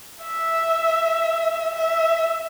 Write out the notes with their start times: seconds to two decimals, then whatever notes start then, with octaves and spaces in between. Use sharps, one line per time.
0.22 E5
1.74 E5